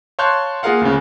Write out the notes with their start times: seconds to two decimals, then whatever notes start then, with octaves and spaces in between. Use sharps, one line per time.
0.19 C#5 F5 A5 C6 F#6 G6
0.63 A#3 F4 G#4 A#4 F5 F#5
0.81 D2 C#3